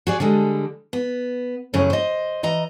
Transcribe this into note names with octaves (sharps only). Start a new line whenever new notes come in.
F#4 G#4 D5
D3 G3 G#3 A4
B3
F#2 A2 C#3 F#3 C#4
C5 D#5
E3 D#5 A#5